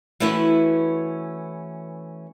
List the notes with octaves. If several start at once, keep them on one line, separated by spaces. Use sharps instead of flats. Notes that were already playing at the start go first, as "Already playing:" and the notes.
E3 A3 C#4 E4 F#4 B4